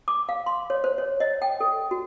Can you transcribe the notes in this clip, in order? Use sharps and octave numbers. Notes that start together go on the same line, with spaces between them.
D6
F5
C6
C#5
C5
C#5
D#5
G5
A4
F#4